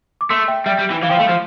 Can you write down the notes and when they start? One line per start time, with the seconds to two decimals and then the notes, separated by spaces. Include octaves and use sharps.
0.21 D6
0.30 A3 C6 E6
0.48 E5 G5
0.66 G3 E5 G5
0.79 G3
0.91 E3
1.03 E3 F5
1.09 F3 G5
1.17 A3 F5
1.29 F3